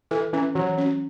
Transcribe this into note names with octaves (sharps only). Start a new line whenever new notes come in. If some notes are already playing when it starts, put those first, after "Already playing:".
E3 A4
E3 C#4
E3 F#3
C#4